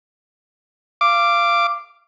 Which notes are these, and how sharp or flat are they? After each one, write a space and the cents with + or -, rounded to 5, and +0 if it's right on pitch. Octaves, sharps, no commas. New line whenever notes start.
F5 -20 D6 +0